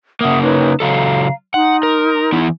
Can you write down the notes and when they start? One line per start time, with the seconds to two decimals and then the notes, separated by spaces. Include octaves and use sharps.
0.21 C#3 A#3 E5 F#5 D#6
0.42 D#4 B4 C#5
0.80 C#3 F#3 A4 F5 A#5
1.54 D#4 F#5 C6
1.83 A#4
2.32 E3 B3 E4